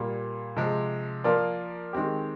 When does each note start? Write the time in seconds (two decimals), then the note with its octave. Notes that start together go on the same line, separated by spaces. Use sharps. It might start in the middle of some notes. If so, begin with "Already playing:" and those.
Already playing: A#2 G3 A#3
0.56 C3 F3 G#3
1.24 F3 A#3 F4 A#4 D5
1.93 D#3 G#3 C4 G4